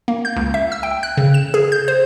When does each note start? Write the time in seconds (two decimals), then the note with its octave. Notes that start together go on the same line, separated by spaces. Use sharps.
0.08 A#3
0.25 G6
0.36 C#2
0.54 E5
0.72 E6
0.83 G5
1.03 F#6
1.17 C#3
1.34 E7
1.54 G#4
1.72 G6
1.88 C5